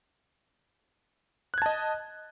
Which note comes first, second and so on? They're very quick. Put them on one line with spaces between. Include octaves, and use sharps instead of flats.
F#6 G#6 A5 D#5